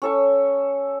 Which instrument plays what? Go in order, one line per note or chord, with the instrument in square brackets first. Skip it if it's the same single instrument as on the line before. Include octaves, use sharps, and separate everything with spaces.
[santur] C#4 A4 C#6